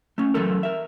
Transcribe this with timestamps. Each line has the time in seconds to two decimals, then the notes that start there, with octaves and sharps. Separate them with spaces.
0.18 A3 C#4
0.34 E3 F#3 A3 A4 A#4
0.63 A#4 E5